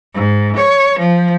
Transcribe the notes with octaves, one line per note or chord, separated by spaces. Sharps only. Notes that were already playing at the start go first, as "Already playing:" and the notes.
G#2
C#5
F3